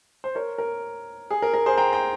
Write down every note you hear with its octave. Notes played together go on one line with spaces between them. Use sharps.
C5
A#4 C#5
A#4
G#4
A#4
A#4
G#4 C5
G5 A#5
G5 A#5